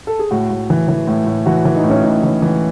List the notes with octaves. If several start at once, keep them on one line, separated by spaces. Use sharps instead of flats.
A4
G#4
A2 F#4
A2
E3
E3
A2
A2
E3 F#4
E3
D#4
A2
C#4
A2 D#4
E3
E3